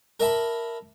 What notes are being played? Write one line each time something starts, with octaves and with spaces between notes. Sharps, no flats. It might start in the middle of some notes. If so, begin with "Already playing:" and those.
A#4 D5 E5 A5 B5